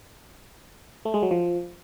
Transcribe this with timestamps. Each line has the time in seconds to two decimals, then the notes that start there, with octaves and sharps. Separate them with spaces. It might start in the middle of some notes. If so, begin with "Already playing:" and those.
1.05 A3
1.14 G#3
1.22 F#3
1.31 F3